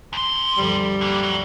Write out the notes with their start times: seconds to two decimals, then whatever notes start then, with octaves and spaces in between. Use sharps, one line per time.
0.13 E2 C6
0.58 D2 G2 F3 G3
1.01 D3 A#3
1.23 F#3